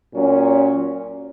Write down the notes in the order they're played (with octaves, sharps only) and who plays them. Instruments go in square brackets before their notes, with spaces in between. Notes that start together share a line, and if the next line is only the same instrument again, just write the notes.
[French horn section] A#2 F#3 C#4